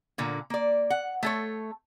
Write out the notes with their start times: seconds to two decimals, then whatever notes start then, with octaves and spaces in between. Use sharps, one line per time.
0.18 A#2 D3 A#3
0.50 A#3 D5
0.90 F#5
1.23 A3 A4 C#5